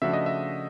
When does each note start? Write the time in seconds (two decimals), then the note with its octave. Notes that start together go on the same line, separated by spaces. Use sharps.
0.02 C#3 F3 A3 D4 F#4 E5
0.13 D#5
0.26 E5